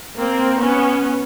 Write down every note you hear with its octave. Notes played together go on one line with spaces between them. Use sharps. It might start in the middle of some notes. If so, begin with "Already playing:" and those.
A#3 C4
B3 C#4